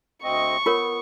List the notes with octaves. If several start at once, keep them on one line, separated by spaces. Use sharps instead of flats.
D2 C4 D#5 C#6
B3 F4 A#4 C#5